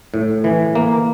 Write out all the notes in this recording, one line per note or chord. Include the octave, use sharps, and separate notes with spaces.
A2
E3
A#3